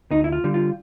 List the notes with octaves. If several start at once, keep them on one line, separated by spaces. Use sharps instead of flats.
D2 D#4
E4
F4
D3 G3
F4